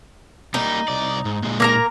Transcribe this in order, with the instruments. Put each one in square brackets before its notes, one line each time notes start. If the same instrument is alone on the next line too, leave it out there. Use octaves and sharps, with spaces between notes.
[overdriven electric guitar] G3 A#3 [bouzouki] D#4
[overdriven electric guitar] C2 D5
G#2
A#2 G#3
[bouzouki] A#3 A#4 A#5